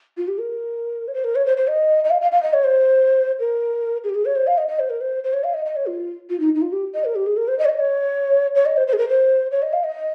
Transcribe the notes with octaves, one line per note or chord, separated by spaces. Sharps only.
F4
G4
A#4
C#5
C5
A#4
C#5
C5
C5
D#5
D#5
F5
F5
F5
D#5
C#5
C5
A#4
G#4
G4
G#4
C#5
C5
F5
D#5
D#5
C5
A#4
C5
C5
C#5
F5
D#5
D#5
C#5
F4
F4
D#4
D#4
F4
G4
D#5
A#4
G4
G#4
A#4
C5
D#5
C#5
D#5
C#5
C#5
D#5
C5
C5
G#4
A#4
C5
C#5
D#5
F5
D#5